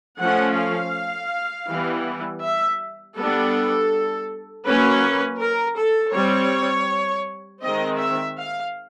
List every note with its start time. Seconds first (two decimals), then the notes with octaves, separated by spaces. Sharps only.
0.20 F3 A3 C#4 F#5
0.57 F5
1.69 E3 G3 B3
2.43 E5
3.16 G3 B3 D4 A4
4.65 F#3 A#3 C#4 B4
5.40 A#4
5.77 A4
6.13 G3 C4 C#5
7.62 D#3 G#3 C4 D#5
7.99 E5
8.37 F5